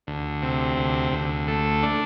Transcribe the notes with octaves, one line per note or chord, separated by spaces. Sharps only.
D2
C3
D2
D2
A3
D4